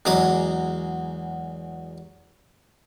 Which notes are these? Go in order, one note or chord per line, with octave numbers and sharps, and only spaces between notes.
E2 F#3 G#3 A#5 D6 D#6